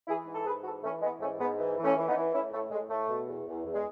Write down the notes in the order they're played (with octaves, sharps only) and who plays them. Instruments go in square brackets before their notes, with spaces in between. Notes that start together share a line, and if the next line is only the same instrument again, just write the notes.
[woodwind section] E3 E4 G#4
G#2
A4
G#2 G#4 B4
E3 F#4 A4
E3 A3 C#4
E3 G#3 B3
G#2 A3 C#4
G#2 G#3 B3
E3
E3
A3 C#4
E3
B3 D#4
E3
A2 C#4 E4
A2 A3
A2 G#3
A2 A3
B2
E2
E2
E2
G#3